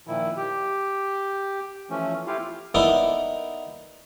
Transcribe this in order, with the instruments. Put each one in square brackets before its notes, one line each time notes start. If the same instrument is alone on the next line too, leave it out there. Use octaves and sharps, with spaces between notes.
[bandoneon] A#2 D#3 F3 E4
G4
E3 F3 A3 C#4
E4 F4 G4 F5
[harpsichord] B3 D#4 E4 A4 A#4 D5